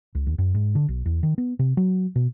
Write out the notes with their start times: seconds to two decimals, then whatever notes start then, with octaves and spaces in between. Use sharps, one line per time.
0.15 C#2
0.27 D#2
0.38 F#2
0.55 G#2
0.75 D3
0.88 B1
1.06 E2
1.23 D#3
1.38 B3
1.59 C3
1.77 F#3
2.16 B2